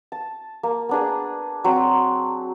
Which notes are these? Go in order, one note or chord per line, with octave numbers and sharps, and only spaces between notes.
A5
A#3
B3 D4 G#4
F#3 C4 F#4